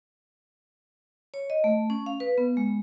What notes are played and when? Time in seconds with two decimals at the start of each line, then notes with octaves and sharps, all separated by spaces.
1.34 C#5
1.50 D#5
1.64 A3
1.90 C#4
2.06 F5
2.20 B4
2.38 B3
2.57 G#3